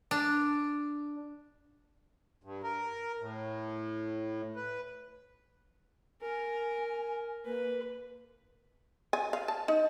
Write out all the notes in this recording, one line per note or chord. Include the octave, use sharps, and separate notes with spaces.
D4
G2
A#4
A2
B4
A#4 G#5
A#3 B4
G#5
F5
A5
D#4